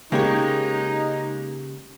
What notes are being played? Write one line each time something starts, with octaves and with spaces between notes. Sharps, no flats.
C#3 G#3 A#3 D#4 G4 C#5